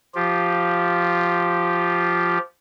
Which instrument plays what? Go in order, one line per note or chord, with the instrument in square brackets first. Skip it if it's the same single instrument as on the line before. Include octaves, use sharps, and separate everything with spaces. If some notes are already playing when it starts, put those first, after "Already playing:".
[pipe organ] F3 F4 G4